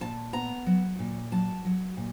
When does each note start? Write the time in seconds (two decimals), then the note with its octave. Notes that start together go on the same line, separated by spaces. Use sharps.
0.01 A#2 A5
0.33 B3 A#5
0.66 F#3
0.99 A#2
1.32 F#3 A5
1.65 F#3
1.97 A#2